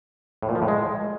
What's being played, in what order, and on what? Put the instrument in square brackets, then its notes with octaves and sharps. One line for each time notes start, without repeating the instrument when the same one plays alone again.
[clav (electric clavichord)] A2
A#2
F3
A2
G#3